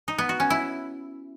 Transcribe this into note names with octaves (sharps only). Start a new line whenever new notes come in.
D#4
B3
F#4
C#4
E4